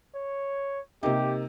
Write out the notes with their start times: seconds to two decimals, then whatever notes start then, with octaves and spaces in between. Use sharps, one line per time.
0.15 C#5
1.03 C3 A#3 D#4 G4